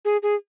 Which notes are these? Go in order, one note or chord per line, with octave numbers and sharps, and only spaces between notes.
G#4
G#4